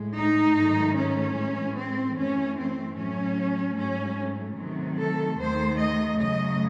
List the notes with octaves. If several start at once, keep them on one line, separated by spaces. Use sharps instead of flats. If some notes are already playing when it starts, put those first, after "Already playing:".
Already playing: A2 G#3
D#4
G#2 D#3 F#3 A3
C#4
A2 E3 G#3
C4
F#2 E3 A3 C#4
C4
A2 F#3 A3 C#4
G#2 F#3 A3 C#4
C3 D#3 F#3 A3
A4
D#2 D#3 A3 C5
D#5
F#2 C#3 F#3 A3 D#5